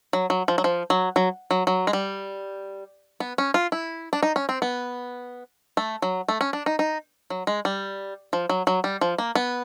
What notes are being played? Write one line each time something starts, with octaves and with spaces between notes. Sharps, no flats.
F#3
F#3
F3
F#3
F3
F#3
F#3
F#3
F#3
G#3
G3
B3
C#4
F4
E4
D4
D#4
C#4
C4
B3
A3
F#3
A3
C#4
D4
D#4
D#4
F#3
G#3
G3
F3
F#3
F#3
G3
F3
A#3
B3